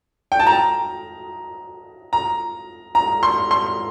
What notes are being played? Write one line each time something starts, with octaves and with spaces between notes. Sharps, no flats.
G5
A5
A#5
A#5
A#5
C6
C6